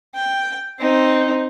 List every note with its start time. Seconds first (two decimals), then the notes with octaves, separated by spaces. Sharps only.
0.15 G5
0.79 C4 D#4